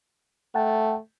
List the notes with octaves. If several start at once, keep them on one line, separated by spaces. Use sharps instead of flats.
A3 F#5 G5 A5